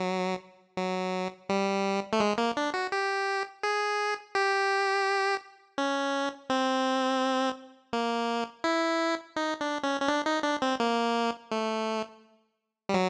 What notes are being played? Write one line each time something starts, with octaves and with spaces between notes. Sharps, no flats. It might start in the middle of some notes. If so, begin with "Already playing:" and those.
Already playing: F#3
F#3
G3
A3
G#3
A#3
D4
F#4
G4
G#4
G4
C#4
C4
A#3
E4
D#4
D4
C#4
C#4
D4
D#4
D4
C4
A#3
A3
G3
F#3